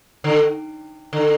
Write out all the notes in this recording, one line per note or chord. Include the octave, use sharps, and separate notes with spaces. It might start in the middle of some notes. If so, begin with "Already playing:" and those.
D3
D3